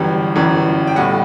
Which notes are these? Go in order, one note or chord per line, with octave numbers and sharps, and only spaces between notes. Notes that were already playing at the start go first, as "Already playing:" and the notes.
Already playing: G1 F#2 E3 G3
G1 F#2 E3 G3
G5
B1 A2 G3 F#5